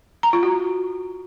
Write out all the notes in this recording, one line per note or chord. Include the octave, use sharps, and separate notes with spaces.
A#5
F4
F#4